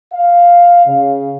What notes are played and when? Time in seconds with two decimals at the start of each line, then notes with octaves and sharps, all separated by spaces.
0.13 F5
0.86 C#3